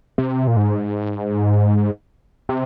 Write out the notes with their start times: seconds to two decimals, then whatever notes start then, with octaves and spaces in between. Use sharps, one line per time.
0.18 C3
0.47 A#2
0.56 G#2
2.49 C3